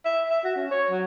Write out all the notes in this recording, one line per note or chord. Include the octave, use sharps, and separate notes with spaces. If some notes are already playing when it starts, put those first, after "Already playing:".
E5
E5
F#4
C#4
C#5
F#3